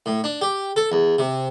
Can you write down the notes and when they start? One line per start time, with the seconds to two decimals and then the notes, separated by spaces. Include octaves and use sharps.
0.06 A2
0.24 D4
0.41 G4
0.76 A4
0.92 E2
1.19 C3